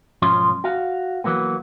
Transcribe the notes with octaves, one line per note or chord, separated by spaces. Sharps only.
B1 G#2 F3 C#4 F4 C6
F#4 F5
E3 F#3 A#3 B3